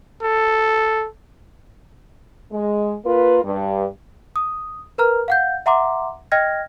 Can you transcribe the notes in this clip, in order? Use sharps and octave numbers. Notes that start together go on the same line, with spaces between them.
A4
G#3
A#3 F4 A#4 B4
G2
D#6
A#4 B4 A#5 F6
F5 F#5 G6
E5 F#5 A#5 C6 D6
D#5 G5 F6 G#6 A#6